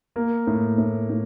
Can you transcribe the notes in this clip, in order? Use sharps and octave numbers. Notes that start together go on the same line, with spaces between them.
A#3
A2
A2
A2